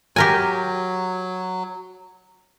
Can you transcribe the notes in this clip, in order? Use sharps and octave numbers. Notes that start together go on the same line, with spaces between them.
F#3 G4 A#4 G#5